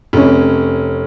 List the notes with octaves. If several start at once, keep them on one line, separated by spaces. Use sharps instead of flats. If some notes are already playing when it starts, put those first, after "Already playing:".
F1 C#4